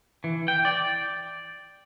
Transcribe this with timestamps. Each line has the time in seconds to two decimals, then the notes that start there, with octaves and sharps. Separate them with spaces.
0.24 E3
0.48 G5
0.65 D5